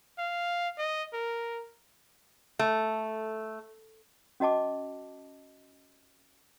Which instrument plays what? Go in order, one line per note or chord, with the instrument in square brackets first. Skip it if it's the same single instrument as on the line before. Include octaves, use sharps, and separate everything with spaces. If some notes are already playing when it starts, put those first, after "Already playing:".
[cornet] F5
D#5
A#4
[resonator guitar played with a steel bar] A3
[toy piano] C#4 F#4 D#5 A5 D6